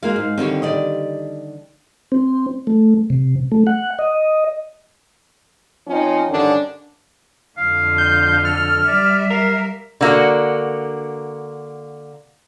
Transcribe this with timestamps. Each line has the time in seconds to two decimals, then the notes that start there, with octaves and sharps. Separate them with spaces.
0.03 G#3 A#3 F#4 F5
0.16 G#2
0.38 D3 D#3 G3 C4 C#5
0.62 G4 D5 D#5
2.12 C4
2.67 A3
3.10 C3
3.52 A3
3.67 F#5
3.99 D#5
5.87 F3 C4 C#4 D#4
6.29 G2 D3 D#3 C#4 D4
7.58 F2 D3 F5
7.98 G6
8.45 A4 F6
8.87 G3 D5 E5
9.30 A#4 F5
10.01 D3 A#3 F#4